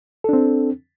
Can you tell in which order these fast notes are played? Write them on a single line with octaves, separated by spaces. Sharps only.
A4 D4 C4